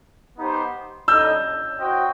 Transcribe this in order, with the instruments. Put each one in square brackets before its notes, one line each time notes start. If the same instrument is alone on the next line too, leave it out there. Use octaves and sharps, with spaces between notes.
[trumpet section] B3 D#4 G4 C5
[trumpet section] G3 D#4 A4 D#5 [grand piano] E6 G6
[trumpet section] F#4 C5 D#5 G5